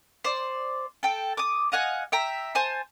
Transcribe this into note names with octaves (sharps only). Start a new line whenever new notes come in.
C5 D5
A4 G5
D6 D#6
D#5 F5 F#5 G#5
E5 G5 A#5
C5 G#5 A5